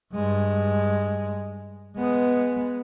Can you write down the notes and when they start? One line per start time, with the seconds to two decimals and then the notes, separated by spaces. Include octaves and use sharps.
0.14 G2 G#3
1.97 G#3 B3